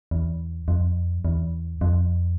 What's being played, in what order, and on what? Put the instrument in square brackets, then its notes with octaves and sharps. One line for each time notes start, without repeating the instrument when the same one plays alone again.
[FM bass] E2
F2
E2
F2